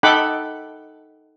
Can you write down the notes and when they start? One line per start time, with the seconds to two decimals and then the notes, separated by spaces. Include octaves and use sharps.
0.03 D#4 A4 F#5 G5 B5 D6